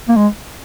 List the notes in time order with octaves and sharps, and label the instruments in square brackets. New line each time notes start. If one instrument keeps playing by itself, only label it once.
[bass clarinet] A#3
G#3